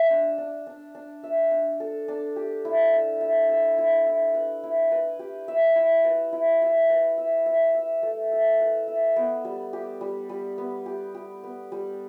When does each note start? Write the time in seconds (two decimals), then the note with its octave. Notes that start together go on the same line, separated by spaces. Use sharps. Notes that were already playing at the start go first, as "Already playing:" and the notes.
Already playing: E5
0.10 D4
0.38 D4
0.67 D4
0.95 D4
1.24 E5
1.51 D4
1.80 A4
2.08 D4
2.36 G4
2.65 E4
2.93 E5
3.21 E5
3.49 E5
3.78 E4
4.06 E4
4.35 B4
4.63 E4
4.92 B4
5.19 G4
5.48 E5
5.76 E4
6.05 B4
6.33 E4
6.62 E5
6.90 B4
7.18 E5
7.46 E5
7.75 E5
8.03 A3
8.32 E5
8.60 B4
8.88 E5
9.16 B3
9.45 G3
9.73 G4
10.01 G3
10.29 G3
10.58 B3
10.86 G4
11.15 G4
11.44 B3
11.72 G3